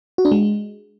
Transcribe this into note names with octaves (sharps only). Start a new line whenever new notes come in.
F#4
D4
G#3